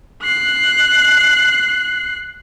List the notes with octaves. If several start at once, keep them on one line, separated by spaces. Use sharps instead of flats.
F#6 C7